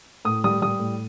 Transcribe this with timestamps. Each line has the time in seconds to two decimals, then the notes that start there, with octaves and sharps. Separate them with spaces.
0.25 A2 D#6
0.44 G3 D#6
0.62 G3 D#6
0.79 A2